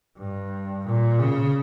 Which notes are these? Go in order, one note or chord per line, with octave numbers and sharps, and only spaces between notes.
G2
A#2
C#3